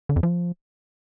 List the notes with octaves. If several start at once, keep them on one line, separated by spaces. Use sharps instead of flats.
D3
F2
F3